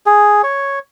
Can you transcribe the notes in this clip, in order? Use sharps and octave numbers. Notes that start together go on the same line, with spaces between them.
G#4
C#5